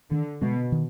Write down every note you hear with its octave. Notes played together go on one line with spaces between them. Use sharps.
D3 D#3
B2 G#3 B3
D#3